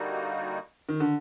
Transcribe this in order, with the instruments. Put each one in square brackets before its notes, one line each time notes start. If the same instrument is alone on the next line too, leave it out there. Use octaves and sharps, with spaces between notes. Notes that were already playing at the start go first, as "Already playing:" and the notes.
Already playing: [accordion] D3 G3 A#3 D#4 F#4
[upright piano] D#3
D3